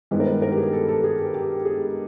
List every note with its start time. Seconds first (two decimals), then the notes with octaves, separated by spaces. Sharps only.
0.11 G2 D#3 G#3 B3 E4
0.20 A#4
0.26 B4
0.42 A#4
0.51 G4
0.58 G#4
0.73 A4
0.88 A4
1.04 G#4
1.19 G4
1.34 G4
1.65 G#4